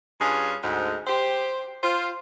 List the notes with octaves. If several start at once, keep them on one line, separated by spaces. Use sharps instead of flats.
G2 C#4 F4 G#4
D2 G#2
G4 C5
F4 C5